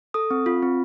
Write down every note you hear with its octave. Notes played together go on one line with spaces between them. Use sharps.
A4 D#6
C4
F4
C4